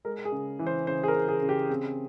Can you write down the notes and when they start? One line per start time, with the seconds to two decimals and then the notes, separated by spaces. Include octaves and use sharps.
0.05 G#3 A#4
0.25 G#4
0.32 C#3
0.59 E3
0.67 C5
0.87 C#3 C5
1.04 G#4
1.08 A#4
1.15 C#3
1.28 G#4
1.42 C#3
1.49 G4
1.70 C4 G#4